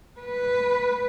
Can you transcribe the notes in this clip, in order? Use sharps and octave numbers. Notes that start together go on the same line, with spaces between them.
B4